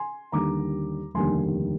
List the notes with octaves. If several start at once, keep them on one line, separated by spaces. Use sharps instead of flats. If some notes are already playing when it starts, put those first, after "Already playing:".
Already playing: G#5 C6
D#2 D3 G3 A#3 A#5 D6
F1 D#2 D3 G3 A#3 G#5 C6